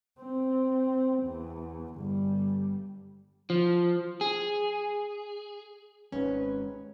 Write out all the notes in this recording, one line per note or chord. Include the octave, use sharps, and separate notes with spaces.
C4
E2
G1 G3
F3
G#4
G#1 G#2 C3 C#4 B4